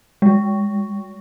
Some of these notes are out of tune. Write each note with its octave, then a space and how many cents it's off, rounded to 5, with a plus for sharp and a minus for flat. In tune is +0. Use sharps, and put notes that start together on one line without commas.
G#3 -20